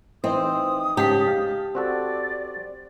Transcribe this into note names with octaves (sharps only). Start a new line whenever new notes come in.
E3 C4 D#4 C5 D#6
G#2 C#3 G#3 G4 A5 B6
F5
C4 F#4 A4 D5